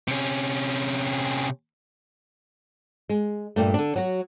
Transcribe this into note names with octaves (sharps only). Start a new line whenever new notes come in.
C3 C#4
G#3
G2 A#2 A3
D3 D4
F#3 F#4